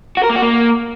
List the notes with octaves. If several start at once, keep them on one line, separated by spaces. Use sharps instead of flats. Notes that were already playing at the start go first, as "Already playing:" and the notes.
F#4
A#4
A#3
F#4
A#3